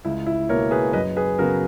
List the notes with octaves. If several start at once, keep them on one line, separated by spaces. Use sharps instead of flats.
C#2 E4
E4
B2 A#3 A#4 C#5
G#4 B4
F#2 B4 D#5
G#4 B4
C#3 F#3 B3 F#4 A#4